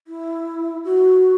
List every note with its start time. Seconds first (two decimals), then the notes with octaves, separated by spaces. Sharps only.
0.07 E4
0.85 F#4